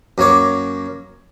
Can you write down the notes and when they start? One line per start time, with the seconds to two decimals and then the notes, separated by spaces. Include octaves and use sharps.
0.18 F#2 A#3 C#5 D6